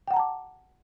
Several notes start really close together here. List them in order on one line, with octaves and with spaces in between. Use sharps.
G5 F#5 A#5 A5 D6